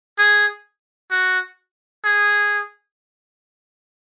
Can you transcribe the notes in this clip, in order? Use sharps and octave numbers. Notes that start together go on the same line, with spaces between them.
G#4
F#4
G#4